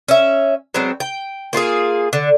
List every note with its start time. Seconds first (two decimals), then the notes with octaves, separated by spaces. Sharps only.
0.08 C#4 E5
0.74 F#3 G#3 B3 C4
1.00 G5
1.53 A#3 F4 F#4 G#4
2.13 D3